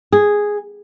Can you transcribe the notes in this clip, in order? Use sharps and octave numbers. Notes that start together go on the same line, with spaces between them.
G#4